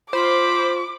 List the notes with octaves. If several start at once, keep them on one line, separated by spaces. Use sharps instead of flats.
F4 C5 B5 D6